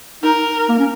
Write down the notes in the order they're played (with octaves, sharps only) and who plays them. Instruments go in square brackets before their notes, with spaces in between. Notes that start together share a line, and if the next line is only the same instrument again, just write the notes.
[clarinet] D#4 [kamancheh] A#4
[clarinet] A#3
C#4